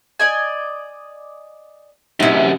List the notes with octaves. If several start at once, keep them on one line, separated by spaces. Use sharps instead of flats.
D5 D#5 G#5
F#2 C3 D#4 E4